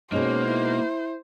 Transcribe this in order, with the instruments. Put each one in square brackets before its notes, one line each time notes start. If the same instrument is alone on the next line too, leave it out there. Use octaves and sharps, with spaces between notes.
[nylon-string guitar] B2 G#3 D#4 [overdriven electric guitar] A#3 [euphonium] C#4 [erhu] C5
[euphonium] E4